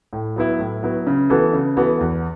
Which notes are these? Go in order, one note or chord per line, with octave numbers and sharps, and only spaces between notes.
A2
F#3 B3 E4
A2
F#3 B3 E4
C#3
E3 B3 F#4 A4
C#3
E3 B3 F#4 A4
E2